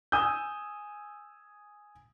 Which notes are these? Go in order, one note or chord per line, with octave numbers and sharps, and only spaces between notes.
G#5 D#6 E6 G6